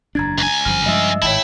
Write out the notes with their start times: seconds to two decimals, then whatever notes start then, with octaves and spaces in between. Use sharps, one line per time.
0.15 F#1 E2 D4 A#5 G#6 A6
0.38 C#2 G#5
0.65 G1 F#2 F3 F6
0.86 G2 F3 G#3 D#5 E5 E6
1.22 G#1 A2 E4 C#5 E5 G5 A5